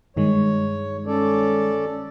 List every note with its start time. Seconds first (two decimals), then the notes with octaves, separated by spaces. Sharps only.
0.17 G2 D#3 G#3 C#5
1.06 C#4 A4 D5